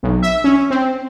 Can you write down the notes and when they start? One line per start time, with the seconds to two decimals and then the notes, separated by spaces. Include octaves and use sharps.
0.03 B1
0.23 E5
0.44 C#4
0.70 C4